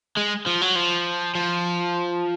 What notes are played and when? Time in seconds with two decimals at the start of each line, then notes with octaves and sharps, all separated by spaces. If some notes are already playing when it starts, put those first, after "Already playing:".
0.17 G#3
0.46 F3
0.61 F#3
0.75 F3
1.35 F3